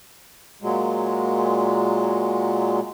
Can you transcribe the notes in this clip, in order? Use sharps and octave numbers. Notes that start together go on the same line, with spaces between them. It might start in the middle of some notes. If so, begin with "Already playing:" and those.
A#2 F#3 G#3